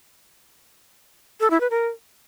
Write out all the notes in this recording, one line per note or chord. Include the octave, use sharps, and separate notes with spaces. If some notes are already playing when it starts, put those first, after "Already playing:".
A4
E4
B4
A#4